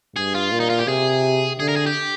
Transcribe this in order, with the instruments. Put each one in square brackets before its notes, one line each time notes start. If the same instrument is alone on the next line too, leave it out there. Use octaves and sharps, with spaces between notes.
[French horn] G2 [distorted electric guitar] G#4
[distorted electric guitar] F4
[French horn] A#2
[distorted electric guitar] D#4
F4
G4
[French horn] C3 [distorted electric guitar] G#4
[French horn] D3 [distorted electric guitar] G#4
[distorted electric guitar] A#4
G#4
G4